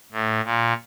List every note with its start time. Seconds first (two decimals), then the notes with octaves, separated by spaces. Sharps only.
0.12 A2
0.44 A#2